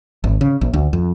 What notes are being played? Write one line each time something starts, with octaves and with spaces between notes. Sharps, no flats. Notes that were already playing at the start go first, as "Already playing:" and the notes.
G#1
C#3
A#1
D2
F2